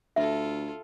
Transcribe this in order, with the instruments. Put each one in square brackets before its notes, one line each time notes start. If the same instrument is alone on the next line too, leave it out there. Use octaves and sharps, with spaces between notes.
[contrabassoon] D2 [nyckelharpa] F4 A4 [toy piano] E5